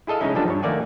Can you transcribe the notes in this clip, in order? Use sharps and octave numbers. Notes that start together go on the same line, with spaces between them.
E4 G#4 A4 D#5 F5
C#3 G#3 C#4 D#4 E4
F3 G3 B3 D4 A4
G2 C#5
D#2 A3 A#3 D5 F#5 G#5